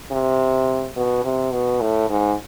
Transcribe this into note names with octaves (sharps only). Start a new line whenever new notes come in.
C3
B2
C3
B2
A2
G#2